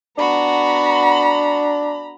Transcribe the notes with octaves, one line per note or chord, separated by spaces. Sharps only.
B3 D4 F#4 A#5 B5